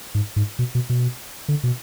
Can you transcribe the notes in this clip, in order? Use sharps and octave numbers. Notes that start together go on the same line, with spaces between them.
G#2
G#2
B2
B2
B2
D3
B2